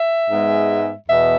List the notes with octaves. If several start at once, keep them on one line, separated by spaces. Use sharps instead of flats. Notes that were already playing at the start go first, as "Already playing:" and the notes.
Already playing: E5
G#2 G#3 B3
E2 B2 B3 E5